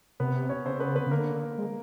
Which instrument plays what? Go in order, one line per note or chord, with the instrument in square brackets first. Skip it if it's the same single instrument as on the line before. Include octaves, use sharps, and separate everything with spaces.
[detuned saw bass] C3 [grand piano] B3 B4
[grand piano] C#4 C#5
[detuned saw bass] C#3 [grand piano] C4 C5
[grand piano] B3 B4
B3 B4
[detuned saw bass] C#3
[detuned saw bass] D3 [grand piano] A#3 A#4
[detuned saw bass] G#3